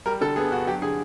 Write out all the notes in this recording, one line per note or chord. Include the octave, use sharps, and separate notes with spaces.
G3 A#4
D3 A4
B3 G#4
G2 F#4
F#3 G4
D3 G#4